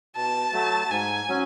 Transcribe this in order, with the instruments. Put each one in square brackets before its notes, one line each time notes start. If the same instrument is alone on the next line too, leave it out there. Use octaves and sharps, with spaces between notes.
[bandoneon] B2 [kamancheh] A5
[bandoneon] F#3 A3
[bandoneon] G#2 [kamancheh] G#5
[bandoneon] F#3 C#4